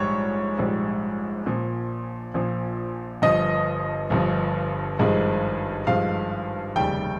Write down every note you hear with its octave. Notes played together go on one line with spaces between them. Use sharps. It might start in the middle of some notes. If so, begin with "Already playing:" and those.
Already playing: A#1 G#2 G3 C#5
A#1 G#2 G3
A#1 A#2 F3
A#1 A#2 F3
G1 G2 F3 D#5
G1 G2 F3
G#1 G2 F3 G#3
G#1 G2 F3 G#3 F5
F1 D#2 C#3 G3 G5